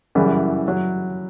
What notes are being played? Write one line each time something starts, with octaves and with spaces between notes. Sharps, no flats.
F#2 C#3 E3 G3 E4
F#3